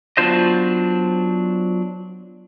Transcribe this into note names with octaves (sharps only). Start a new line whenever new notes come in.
F#3 B3 D4 F4 C5 D#5